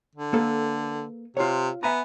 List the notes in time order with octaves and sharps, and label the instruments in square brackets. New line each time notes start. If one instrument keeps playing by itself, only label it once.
[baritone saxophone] D3
[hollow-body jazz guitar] A#3 A4 B4
[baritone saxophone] C3 [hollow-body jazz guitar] F4 C#5
[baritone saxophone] B3 [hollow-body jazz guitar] E5 G#5 A#5